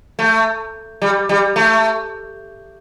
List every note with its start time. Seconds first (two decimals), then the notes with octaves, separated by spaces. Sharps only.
0.19 A3
1.02 G3
1.29 G3
1.56 A3